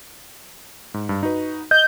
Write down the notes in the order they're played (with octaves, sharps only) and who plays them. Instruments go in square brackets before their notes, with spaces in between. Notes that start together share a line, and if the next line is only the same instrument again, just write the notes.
[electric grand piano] G#2
G2
D#4 F#4 B4
[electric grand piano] D#5 [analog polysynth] G6